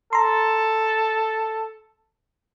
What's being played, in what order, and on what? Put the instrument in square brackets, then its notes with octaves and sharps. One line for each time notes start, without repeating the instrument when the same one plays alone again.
[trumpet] A4 [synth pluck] A#5 C6